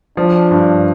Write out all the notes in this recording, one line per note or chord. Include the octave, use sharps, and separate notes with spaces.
F3 D4
G2